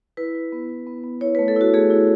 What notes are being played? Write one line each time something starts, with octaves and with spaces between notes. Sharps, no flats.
E4 B4
E4
B3
E4
B3
B3
E4 C#5
A3 B4
A4
E4 F#4
A3 G#4
E4